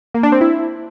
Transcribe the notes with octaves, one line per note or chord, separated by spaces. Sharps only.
A#3
D4
C4
E4